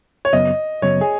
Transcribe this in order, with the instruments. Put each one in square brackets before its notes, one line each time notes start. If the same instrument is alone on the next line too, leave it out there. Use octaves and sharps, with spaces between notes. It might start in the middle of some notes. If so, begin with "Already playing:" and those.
[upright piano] C#5
[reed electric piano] F#2 C#3 F#3 B3 [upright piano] D#5
[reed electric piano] F#2 C#3 F#3 B3 [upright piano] C#5
[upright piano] G#4